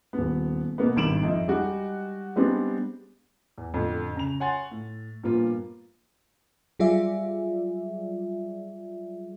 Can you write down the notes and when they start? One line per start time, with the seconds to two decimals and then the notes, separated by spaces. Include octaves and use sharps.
0.13 D#1 B3
0.78 B2 A#3 B3
0.96 G#1 G2 D7 E7 F#7
1.23 F2 D#4 E5
1.48 G3 G#3 D#4 F#4
2.36 G3 G#3 B3 C4 D4
3.58 E2
3.74 F2 A2 D3
4.15 C#3 A#5 F7
4.40 C#5 F#5 G#5 C6 A6
4.71 A2
5.24 G2 A#2 F3 A#3 B3 F4
6.79 F#3 G3 F4 G#4 D5 E5